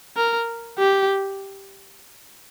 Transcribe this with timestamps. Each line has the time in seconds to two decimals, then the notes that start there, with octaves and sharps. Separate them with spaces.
0.17 A#4
0.79 G4